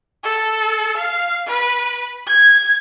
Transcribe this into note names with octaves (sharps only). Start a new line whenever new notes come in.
A4
F5
B4
G#6